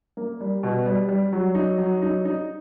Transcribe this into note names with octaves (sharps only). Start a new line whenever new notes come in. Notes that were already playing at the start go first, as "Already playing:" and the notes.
A#3
G3
B2
G3
G3
F#3
D#4
F#3
D#4
D#4